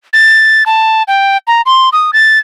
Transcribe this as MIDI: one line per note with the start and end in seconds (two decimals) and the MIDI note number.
0.13 0.64 93
0.66 1.03 81
1.08 1.37 79
1.47 1.62 82
1.66 1.89 84
1.93 2.11 87
2.13 2.39 93